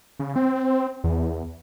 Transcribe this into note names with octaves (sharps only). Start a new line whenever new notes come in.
C#3
C4
E2